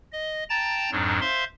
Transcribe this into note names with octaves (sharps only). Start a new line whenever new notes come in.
D#5
G5 A5 A#5 A6
F2 G#2 F#3 D4
C5 E5 F5 C6